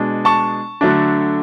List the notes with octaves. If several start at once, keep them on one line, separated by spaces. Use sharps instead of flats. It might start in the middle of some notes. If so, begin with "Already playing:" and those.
Already playing: B2 G#3 D4
A5 C#6
D3 F#3 A3 D4